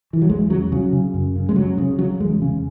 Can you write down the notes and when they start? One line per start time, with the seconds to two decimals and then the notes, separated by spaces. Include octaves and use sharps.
0.13 E3
0.22 F#3
0.29 E2 G#3
0.50 C#3 F#3
0.72 C#3 F#3
0.93 C#3
1.14 F#2
1.36 C#3
1.49 G#3
1.56 C#3 F#3
1.78 C#3
1.99 C#3 F#3
2.20 E2 G#3
2.42 C#3